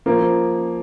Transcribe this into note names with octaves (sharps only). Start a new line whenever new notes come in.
F3 A#3
F3